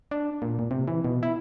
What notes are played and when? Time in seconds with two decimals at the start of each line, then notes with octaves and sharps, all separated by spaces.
0.11 D4
0.42 A#2
0.59 A#2
0.71 C3
0.88 E3
1.05 B2
1.23 E4